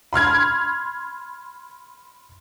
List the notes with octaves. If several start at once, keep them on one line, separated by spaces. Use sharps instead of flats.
B5 C6 F6 G#6